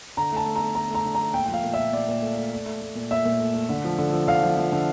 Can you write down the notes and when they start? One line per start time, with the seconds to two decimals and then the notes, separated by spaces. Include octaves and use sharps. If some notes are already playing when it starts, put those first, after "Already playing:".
0.17 D3 A#5
0.32 A3 A5
0.46 A3
0.55 A#5
0.62 A3
0.75 A3 A#5
0.90 A3 A#5
1.05 D3
1.15 A3 A#5
1.34 A#2 G5
1.46 F3 G5
1.54 F5
1.64 A#2
1.73 E5
1.79 A#2
1.93 A#2 D5
2.08 A#2
2.22 A3
2.37 A3
2.51 A3
2.66 A3
2.81 A3
2.95 A#2
3.11 A#2 E5
3.25 A#2
3.40 A3
3.54 A3
3.69 D3
3.84 F3
3.98 D3
4.12 F3
4.28 D3 F5
4.42 F3
4.56 F3
4.72 D3